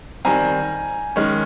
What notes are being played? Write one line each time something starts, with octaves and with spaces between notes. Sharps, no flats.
D#3 G3 C4 G#5 A#5
D#3 G#3 C#4